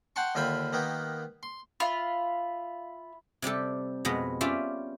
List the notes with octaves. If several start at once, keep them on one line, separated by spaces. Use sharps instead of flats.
F#5 G5 A5 C6 C#6
D#2 D3 F4 E5 G5 B5
D#3 A#3 B3 G4
C6
F4 E5 B5
C3 G3 G4 A4
F2 B2 G#3 B3
C#4 F4 G4 D5 E5